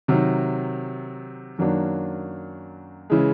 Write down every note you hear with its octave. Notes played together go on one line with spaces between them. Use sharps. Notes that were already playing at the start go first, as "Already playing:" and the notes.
C3 D#3 F#3
F#2 D#3 F#3 A#3 D4
C#3 E3 G#3